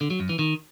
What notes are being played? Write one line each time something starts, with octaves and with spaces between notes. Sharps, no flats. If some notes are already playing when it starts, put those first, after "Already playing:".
D3
F#3
F#2
E3
D#3